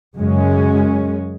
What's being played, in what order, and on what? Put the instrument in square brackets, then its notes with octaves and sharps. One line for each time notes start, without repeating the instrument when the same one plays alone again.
[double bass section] F#2 C#3 G#3 C#4